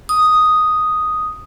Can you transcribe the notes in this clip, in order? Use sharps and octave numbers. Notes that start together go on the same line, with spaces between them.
D#6